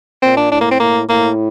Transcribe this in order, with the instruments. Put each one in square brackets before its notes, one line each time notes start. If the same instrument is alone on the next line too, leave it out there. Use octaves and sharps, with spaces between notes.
[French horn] A#2 [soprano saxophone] C4
[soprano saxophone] D4
[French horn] A2 [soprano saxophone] D4
[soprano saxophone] A#3
C4
[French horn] A2 [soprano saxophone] A#3
[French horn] A2 [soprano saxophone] A#3